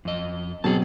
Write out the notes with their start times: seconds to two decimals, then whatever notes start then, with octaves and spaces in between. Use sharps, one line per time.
0.05 F2 D#5
0.64 B2 F#3 C4 G#4 A5